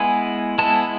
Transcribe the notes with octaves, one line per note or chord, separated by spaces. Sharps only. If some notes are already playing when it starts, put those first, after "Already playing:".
Already playing: G#3 B3 E4 G#5
G#3 B3 E4 A5